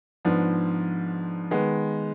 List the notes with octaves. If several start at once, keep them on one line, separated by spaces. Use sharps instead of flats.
G#2 F3 B3 D4
D#3 G#3 B3